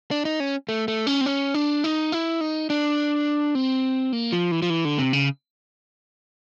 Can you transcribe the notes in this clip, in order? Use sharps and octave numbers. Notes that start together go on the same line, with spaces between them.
D4
D#4
C#4
A3
A3
C#4
C4
C#4
D4
D#4
E4
D#4
D4
C4
A#3
F3
E3
F3
E3
D3
C3
C#3